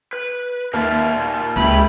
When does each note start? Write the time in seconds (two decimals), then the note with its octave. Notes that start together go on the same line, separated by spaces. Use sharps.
0.13 B4
0.74 D#2 A#3 A#4 D5 E5
1.17 A#2
1.56 C#2 E4 G4 B4 B5